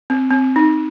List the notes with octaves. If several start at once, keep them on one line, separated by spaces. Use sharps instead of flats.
C4
C4
D#4